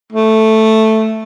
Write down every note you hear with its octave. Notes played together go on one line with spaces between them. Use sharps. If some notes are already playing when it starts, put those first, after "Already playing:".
A3